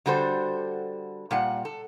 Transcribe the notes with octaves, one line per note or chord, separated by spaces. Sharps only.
D3 G3 F#4 A4 C5
A#2 G3 F#5
A4